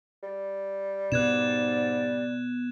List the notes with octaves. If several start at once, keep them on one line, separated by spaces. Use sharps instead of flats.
G3
G#2 B2 D5 F#6 G#6 E7